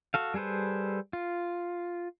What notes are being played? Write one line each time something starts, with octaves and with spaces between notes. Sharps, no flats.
F#4 A4 F5
G3 G#4 A4 B4 C5
F4